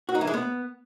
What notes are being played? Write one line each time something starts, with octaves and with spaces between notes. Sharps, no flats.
F#4
D#4
E3
G#3
B3